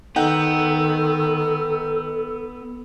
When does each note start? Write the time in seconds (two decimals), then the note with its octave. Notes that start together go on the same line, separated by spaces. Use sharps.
0.16 D#3 B3 D#4 A4 F#5 G5